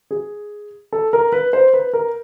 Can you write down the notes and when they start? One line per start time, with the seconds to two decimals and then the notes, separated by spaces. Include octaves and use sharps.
0.11 G#4
0.93 A4
1.13 A#4
1.32 B4
1.53 C5
1.74 B4
1.93 A#4